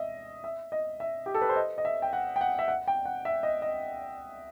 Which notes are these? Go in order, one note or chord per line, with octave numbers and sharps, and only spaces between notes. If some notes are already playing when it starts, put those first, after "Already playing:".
Already playing: D#5 E5
E5
D#5
E5
G4
A4
B4
C5
D#5
D#5
E5
G5
F#5
G5
F#5
E5
F#5
G5
F#5
E5
D#5
D#5